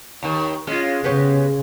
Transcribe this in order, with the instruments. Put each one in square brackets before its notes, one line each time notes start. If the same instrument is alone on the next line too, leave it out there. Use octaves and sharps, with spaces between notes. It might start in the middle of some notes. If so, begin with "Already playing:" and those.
[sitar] D#2 D#3
[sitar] G#3 [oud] C#4 F4
[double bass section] C#3 [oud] B3 G4 C#5